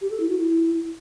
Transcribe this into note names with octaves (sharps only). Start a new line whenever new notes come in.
G4
A4
E4
F#4
E4